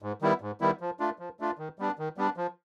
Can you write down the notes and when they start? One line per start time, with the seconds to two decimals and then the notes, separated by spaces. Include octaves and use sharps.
0.02 G#2
0.22 D#3 G3 B3 E4
0.41 G#2
0.61 D#3 G3 B3 E4
0.80 F3
1.00 A3 D4 F4
1.19 F3
1.40 A3 D4 F4
1.59 D#3
1.79 G3 B3 D4
1.99 D#3
2.17 G3 B3 D4
2.37 F3